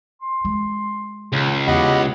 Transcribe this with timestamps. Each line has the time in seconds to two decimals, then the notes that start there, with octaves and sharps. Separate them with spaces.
0.22 C6
0.45 G#3
1.32 C#2
1.68 E2 G4 D#5 F#5 B5